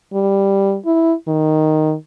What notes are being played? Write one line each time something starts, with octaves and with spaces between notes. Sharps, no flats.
G3
E4
D#3